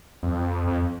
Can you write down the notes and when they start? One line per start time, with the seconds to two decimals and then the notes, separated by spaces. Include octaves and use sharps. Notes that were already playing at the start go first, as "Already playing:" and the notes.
0.23 F2
0.67 F2